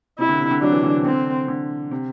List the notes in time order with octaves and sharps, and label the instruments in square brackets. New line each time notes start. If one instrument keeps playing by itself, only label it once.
[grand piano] C3 [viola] E4
[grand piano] D3
C3
D3
[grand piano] F#3 [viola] D4
[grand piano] E3
D3
C3
[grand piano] D3 [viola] C4
[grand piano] D3
C3